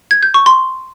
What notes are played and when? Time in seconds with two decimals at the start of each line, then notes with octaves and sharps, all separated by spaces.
0.11 G#6
0.23 G6
0.34 C#6
0.46 C6